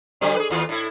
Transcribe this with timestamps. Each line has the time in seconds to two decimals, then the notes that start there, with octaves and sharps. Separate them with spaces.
0.21 D3 F#3 C4
0.36 G#4 B4
0.50 D#2 F4
0.69 A2 E4